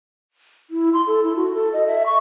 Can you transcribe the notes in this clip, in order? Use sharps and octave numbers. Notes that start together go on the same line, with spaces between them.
E4
C6
A4
E4
F#4
A4
D#5
E5
C#6